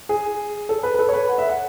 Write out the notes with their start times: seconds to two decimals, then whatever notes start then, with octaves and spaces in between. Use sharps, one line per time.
0.09 G#4
0.69 A4
0.83 B4
0.94 B4
0.99 A4
1.09 C#5
1.13 B4
1.29 F#5
1.38 E5
1.49 F#5